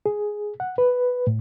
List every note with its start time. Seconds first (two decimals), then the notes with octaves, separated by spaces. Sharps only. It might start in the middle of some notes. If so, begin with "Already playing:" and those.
0.06 G#4
0.60 F#5
0.78 B4
1.27 A2